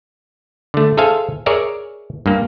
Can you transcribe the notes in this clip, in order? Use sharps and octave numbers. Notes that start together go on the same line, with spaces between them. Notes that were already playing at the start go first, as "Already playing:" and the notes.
D3 A3
G#4 A4 C5 E5 F5 G#5
G#4 A#4 C#5 D5 E5
G2 A#3